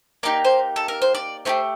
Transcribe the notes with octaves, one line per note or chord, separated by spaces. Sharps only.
A#3 D#4 G4 D5
C5
A4
A#4
C5
D5
A3 D#4 G4 C5